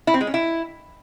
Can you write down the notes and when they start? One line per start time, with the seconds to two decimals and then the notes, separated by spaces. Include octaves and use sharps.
0.07 E4
0.14 C4
0.21 G#3
0.27 C#4
0.34 E4